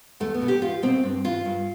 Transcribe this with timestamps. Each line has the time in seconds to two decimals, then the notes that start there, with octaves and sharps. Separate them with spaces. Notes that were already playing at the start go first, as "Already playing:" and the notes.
0.20 E2 A3
0.34 B3
0.42 B2
0.48 G4
0.62 E2 F4
0.83 B2 C4
1.03 G2
1.24 E3 F4
1.45 G2